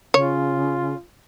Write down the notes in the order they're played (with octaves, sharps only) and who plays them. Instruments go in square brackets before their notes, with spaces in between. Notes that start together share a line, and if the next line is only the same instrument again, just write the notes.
[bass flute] C#3 [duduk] F4 [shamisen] C#5